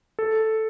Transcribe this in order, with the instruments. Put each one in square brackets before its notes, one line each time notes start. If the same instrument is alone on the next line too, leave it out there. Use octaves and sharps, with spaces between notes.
[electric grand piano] A4